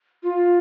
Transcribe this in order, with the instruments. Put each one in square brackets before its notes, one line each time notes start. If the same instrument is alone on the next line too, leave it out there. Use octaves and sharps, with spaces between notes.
[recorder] F4